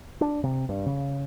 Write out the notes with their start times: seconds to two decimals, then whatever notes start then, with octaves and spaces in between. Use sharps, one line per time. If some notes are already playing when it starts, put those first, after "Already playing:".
0.21 D4
0.44 C3
0.69 G2
0.86 C#3